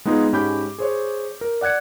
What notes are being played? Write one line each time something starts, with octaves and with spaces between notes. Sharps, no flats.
G#3 B3 D#4 F4 G#4
G#2 C#4 G4 B5 D6 G6
G#4 C5 C#5
A#4
D5 F#5 F#6 G#6 C#7